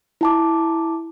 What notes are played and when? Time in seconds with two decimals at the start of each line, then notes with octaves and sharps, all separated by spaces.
0.21 E4 A5 D6